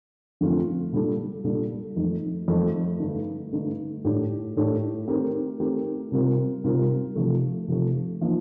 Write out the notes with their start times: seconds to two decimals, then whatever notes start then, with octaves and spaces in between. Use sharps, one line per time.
0.41 F2 D3 A3 C4 F4
0.92 A#2 G3 D4 A4
1.44 A#2 G3 D4 A4
1.96 F2 D#3 A3 D#4
2.48 F2 D#3 A3 D#4
3.00 G2 D3 A3 D#4
3.52 G2 D3 A3 D#4
4.05 A2 A3 D4 G4
4.57 A2 A3 D4 G4
5.08 D#3 A3 C4 G4 A#4
5.60 D#3 A3 C4 G4 A#4
6.12 C3 G3 C4 F4 A#4
6.64 C3 G3 C4 F4 A#4
7.16 C3 F3 A3
7.68 C3 F3 A3
8.21 F3 A#3 D#4